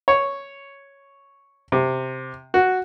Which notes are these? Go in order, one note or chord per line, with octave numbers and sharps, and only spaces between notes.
C#5
C3
F#4